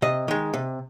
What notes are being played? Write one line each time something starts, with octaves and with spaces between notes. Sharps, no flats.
C3 D#5
D#3 G#3
C3